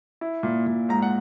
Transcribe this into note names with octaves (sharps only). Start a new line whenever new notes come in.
E4
A#2
A#2
G#2 A#5
F#5